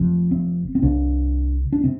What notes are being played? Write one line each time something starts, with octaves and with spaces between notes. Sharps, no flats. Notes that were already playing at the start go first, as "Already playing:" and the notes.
Already playing: F1 F2 C3
C4
C4
C2 C3 D4
D4
C3 C4